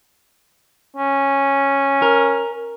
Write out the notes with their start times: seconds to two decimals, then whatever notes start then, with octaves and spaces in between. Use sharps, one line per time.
0.96 C#4
2.02 A#4